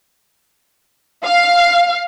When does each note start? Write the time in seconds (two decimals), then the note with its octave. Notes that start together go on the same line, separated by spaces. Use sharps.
1.24 F5